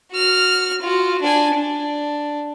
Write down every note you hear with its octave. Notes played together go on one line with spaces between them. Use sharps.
F#4 F6
F4 F#4
D4 G#5
D4